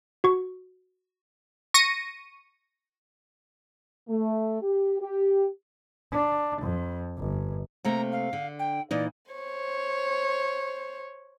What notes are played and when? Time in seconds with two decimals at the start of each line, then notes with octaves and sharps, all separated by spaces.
0.24 F#4 C#6
1.74 C#6 A#6 C#7 D#7
4.08 A3
4.62 G4
5.00 G4
6.12 D4
6.62 F2
7.18 G1
7.85 C3 A3 A#3 A#5
8.12 F5
8.33 D3
8.59 G5
8.91 A#2 E3 D#4 D5
9.32 C5 C#5